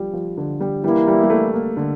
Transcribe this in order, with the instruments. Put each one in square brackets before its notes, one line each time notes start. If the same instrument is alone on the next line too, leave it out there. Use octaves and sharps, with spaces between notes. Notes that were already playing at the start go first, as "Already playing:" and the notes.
Already playing: [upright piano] F3 G3
F3
D3
G3
[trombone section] E3 A#3 E4 [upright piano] G3
[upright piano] G3
G3
A3
A#3
D3